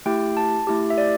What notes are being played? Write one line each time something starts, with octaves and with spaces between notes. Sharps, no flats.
A3 E4 G4 G5
A5
A3 E4 G4
E5
D5